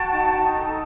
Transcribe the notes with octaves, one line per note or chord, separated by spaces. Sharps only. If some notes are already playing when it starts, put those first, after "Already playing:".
Already playing: F#4 G5 A5
D#4
D#4
A4